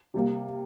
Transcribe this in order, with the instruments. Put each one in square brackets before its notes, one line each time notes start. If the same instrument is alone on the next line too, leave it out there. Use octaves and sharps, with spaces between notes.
[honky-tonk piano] C3 G3 A#3